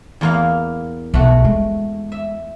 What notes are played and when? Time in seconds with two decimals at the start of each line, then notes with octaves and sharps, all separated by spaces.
0.21 E2 A#3 F5
1.14 B1 A3 F#4
1.44 G#3
2.12 E5